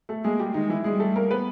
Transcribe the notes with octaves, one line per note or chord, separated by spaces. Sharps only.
A3 A4
G#3 A#3 G#4
G3 G4
D#3 G#3 D#4
E3 E4
G3 G#3 G#4
A3 A4
A#3 A#4
B3 B4